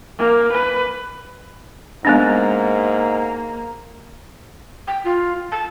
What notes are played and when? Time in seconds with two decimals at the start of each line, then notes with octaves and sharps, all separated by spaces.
0.18 A#3
0.52 B4
2.05 G#2 G#3 A#3 B3 D4
4.87 G5
5.04 F4
5.52 A5